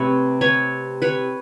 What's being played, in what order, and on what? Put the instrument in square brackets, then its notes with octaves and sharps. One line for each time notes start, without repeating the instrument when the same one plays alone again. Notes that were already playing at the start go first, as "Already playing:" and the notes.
Already playing: [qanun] C3 A3 B4 C#5
B4 C#5
B4 C#5